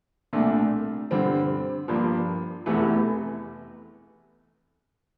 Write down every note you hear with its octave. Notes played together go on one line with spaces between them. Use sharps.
C2 A#2 A3 D4
G2 D3 G3 C4
G2 F3 A#3 D4
F1 E2 C3 E3 A3